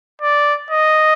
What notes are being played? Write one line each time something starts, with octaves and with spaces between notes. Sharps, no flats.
D5
D#5